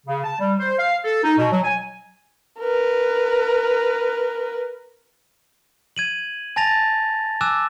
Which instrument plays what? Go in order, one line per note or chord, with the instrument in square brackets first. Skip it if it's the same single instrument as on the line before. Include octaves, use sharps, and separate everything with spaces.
[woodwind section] C#3
A5
G3
C5
F5
A4
D#4
B2
F#3
G#5
[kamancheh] A#4 B4
[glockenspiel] G#6 D#7 F#7
G#5 A5 A6 A#6 F7
G#5 D6 E6 F#6 E7